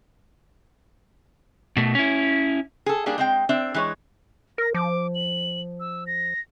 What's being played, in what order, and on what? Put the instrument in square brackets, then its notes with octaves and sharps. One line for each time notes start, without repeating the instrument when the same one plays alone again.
[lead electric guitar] B2 A3
C#4 E4
[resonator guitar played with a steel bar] G#4 A4
G3 A#3 D4 G#4
G#3 C4 G5
C4 D4 E5
E3 G#3 C#5
[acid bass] A#4 [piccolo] A#6
[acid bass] F3 [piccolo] D6
[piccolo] F#7
E6
A#6